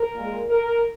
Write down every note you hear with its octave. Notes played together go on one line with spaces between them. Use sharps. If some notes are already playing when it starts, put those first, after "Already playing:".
Already playing: A#4
A#2 G#3
A#4